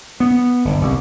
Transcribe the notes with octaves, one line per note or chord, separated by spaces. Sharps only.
B3
G1
C2